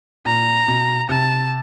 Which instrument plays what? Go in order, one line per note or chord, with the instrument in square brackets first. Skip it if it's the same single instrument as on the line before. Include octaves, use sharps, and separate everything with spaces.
[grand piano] A#2 [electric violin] A#5
[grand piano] B2
[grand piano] C3 [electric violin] A5